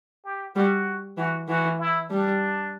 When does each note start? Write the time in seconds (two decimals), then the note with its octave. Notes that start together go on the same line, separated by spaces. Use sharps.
0.25 G4
0.55 G3 F#4
1.17 E3 F#4
1.48 E3 F#4
1.79 E4
2.10 G3 D4